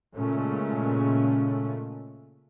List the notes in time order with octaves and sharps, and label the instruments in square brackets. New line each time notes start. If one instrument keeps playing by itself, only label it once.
[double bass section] A#2 C#3 G#3 A3 C#4